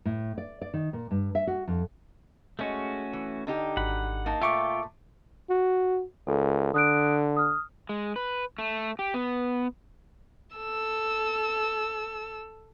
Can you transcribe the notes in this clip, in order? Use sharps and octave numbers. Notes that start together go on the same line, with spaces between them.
A2
D5
D5
D#3
A#2
G2
E5
F#4
F2
G#3 A3 C#4 F#4
E3
D3 D#4 G4
G#1 F#5 B5
A#3 D#4 A5
A#2 A3 F4 E5 G5 C#6 D6
F#4
C#2 A4
D3 D#6 F#6 D7
D#6 F6
G#3
B4
A3
G4
B3
A4 E6